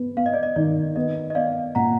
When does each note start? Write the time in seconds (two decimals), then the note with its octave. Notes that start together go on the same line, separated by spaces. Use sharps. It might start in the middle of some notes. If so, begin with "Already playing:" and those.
Already playing: B3
0.17 B3 F5
0.26 D#5
0.34 D5
0.43 D#5
0.56 D#3 D5
0.96 B3 D#5
1.30 D#5
1.35 B3 D5 F5
1.75 A#2 F#5 A#5